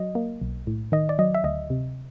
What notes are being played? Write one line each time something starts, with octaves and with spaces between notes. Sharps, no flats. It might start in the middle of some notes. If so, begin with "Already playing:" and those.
Already playing: F#3 D#5
A#3
B1
A2
D#3 D#5
D5
F#3 D#5
E5
D2 D#5
C3